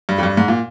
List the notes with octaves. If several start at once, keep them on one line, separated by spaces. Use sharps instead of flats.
G2
F2
G2
G#2
A#2